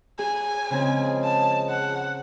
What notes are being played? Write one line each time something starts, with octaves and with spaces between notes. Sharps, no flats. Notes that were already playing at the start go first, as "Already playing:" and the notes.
G#4 G#5
C#3 F3 G#3 C4 G#4
A5
F#5